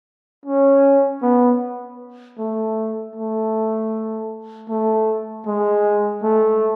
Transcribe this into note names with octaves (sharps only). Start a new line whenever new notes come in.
C#4
B3
A3
A3
A3
G#3
A3